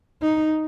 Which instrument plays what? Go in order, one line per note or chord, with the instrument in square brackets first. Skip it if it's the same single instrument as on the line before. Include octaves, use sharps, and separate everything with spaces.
[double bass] D#4